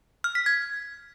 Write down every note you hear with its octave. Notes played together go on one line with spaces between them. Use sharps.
F6
B6
G#6